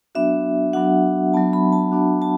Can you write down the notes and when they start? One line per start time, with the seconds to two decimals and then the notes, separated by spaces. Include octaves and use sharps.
0.15 F#3 B3 D4 F#4 E5
0.73 F#3 B3 D4 F#4 F#5
1.33 F#3 B3 D4 F#4 A5
1.53 B5
1.73 A5
1.92 F#3 B3 D4 F#4
2.22 A5